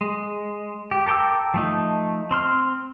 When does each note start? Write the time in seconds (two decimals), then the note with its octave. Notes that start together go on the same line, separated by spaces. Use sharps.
0.01 G#3
0.91 G4
1.06 A4 A#4 G5 D6 E6
1.54 F3 A3 D#4
2.31 C4 C6 F6